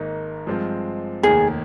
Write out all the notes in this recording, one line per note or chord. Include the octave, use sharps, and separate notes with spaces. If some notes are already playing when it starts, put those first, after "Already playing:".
Already playing: G#1 G#2 D#3 A#3 D#4
G2 F3 G#3 C4 F4
F1 D#2 D#3 G#4